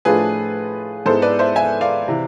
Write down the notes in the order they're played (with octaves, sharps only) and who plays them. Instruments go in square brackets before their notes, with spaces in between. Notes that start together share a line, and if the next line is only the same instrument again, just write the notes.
[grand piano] A2 F3 A3 D4 F4 G#4 B4
G#2 G#3 B3 E4 A4 C5
B4 D5
C5 E5
E5 G#5
D5 F5
C3 E3